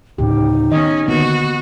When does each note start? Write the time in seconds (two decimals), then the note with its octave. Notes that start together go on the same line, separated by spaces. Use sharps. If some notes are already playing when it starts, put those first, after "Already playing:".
0.18 D2 A2 C#3 D#4 G4
0.72 D#3 B3 C#4 D#5
1.08 D3 D#3 A#3 B3 F#4